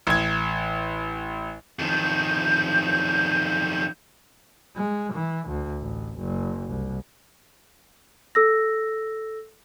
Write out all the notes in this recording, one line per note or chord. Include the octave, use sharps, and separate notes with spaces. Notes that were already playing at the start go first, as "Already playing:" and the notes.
A1 G#6
F2 D#3 G6
G#3
E3
D2
A1
F#1
C2
A4 E6 A#6